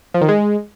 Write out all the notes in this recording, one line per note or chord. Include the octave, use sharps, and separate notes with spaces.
F3
D#3
G#3